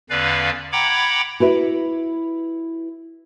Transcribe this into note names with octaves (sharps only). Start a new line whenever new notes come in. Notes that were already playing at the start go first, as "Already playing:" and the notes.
E2 D3 C#4 B4 D5 F5
F#5 G5 A#5 B5 D6 G#6
E4 F#4 B4 E5